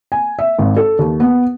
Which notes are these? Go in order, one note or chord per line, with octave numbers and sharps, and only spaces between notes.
G#5
E5
G#1
A4
D#2
B3